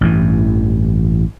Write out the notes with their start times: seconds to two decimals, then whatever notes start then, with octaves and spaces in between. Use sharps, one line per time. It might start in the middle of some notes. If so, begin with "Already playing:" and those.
0.01 A1 G2 E3